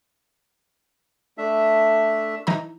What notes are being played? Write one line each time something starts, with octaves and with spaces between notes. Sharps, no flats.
A3 D4 E5
E3 D#4 A#5